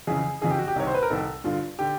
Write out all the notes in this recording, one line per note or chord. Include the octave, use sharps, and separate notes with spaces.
F2 C#3 E3 G#4
F2 C#3 E3 G#4
G4
F#4
G4
C2 C3 D#3 C#5
C5
B4
A#4
C2 C3 D#3 A4
G2 D3 F4
D3 G4